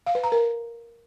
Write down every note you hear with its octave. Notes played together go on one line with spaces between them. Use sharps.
F5
B4
A#5
A#4